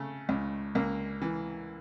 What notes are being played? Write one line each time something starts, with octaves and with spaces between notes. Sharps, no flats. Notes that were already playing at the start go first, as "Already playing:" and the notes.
Already playing: C#3 A3
C#2
C#2 A#3
E3